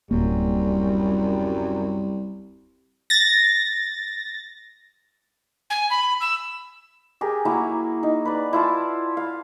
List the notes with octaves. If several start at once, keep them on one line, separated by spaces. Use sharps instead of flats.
D1 C2 F#2 G3 A#3
A6 A#6
G#5
B5
E6
G4 G#4 A#4
F#3 A#3 E4
D#4
B4 D5
E4 F4 A5
F5